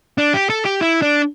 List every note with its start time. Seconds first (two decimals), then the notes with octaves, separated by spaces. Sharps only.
0.18 D4
0.34 G4
0.50 A4
0.65 G4
0.81 E4
1.02 D4